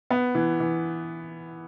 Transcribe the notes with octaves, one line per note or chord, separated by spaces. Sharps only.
B3
E3
E3